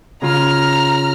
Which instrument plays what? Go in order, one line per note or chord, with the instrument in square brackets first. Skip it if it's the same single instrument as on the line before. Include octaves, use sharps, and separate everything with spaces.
[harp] C#3 F4 [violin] A#5 F6